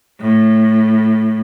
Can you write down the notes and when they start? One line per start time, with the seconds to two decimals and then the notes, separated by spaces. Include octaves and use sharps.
0.19 A2